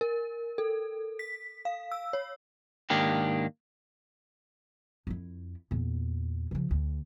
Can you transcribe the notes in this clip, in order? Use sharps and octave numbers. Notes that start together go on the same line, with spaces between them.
A#4
A4
B6
F5
E6
C#5
G#2 D#3 A#3 D4 G4
F2 E4
E2 A#2
C#3 F3
D2